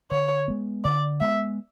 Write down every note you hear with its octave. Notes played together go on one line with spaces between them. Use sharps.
D3 C#5
G#3 B3
D3 D5
G#3 B3 E5